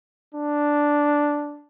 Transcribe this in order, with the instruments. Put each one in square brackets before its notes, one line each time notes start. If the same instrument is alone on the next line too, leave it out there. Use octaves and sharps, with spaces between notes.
[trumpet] D4